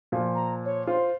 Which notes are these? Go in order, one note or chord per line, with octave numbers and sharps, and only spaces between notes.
A#2 F3
A#5
C#5
F4 C5